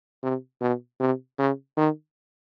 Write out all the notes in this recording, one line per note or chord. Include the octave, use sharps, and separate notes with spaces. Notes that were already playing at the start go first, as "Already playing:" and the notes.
C3
B2
C3
C#3
D#3